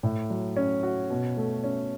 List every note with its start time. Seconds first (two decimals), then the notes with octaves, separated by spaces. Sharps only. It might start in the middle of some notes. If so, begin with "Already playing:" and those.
0.03 A2
0.30 F#3
0.57 C#4
0.83 F#4
1.10 B2
1.37 A3
1.64 C#4